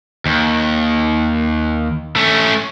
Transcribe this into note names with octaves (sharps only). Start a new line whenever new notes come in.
D#2
A3 C#4